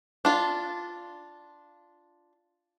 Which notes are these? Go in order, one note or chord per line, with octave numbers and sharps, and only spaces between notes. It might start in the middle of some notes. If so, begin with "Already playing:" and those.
D4 F4